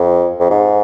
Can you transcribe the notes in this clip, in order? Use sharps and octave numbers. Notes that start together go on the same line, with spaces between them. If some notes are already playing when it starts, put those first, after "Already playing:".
Already playing: F2
F2
G#2